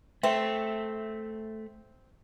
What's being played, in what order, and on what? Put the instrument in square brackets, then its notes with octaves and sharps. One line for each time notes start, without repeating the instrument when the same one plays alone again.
[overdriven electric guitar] A3 [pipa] C4 [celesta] E5